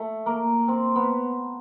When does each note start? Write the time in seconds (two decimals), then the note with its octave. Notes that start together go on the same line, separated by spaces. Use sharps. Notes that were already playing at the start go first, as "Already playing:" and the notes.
Already playing: A3
0.26 A#3
0.68 C4
0.95 B3